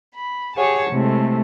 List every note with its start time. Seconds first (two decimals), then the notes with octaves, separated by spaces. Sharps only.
0.15 B5
0.56 G4 G#4 C#5 F#5 A5
0.91 A2 C3 G#3 A3